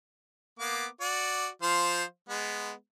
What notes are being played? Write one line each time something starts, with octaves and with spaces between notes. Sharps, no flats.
A#3 B3 D6
F#4 D5
F3 C5 F5
G#3 B3